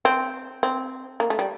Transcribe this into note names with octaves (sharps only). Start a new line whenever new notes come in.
C4
C4
A#3
A3
G3